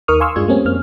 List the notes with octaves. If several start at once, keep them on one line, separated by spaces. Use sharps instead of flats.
D#2 D#4 A#4 C#6 D#6 F6
F5 G#5 C6 C#6 E6 F6
G2 G#3 D4 F4 G#6
G3 A3 A#3 C4 C#4
F2 A#3 C4 F6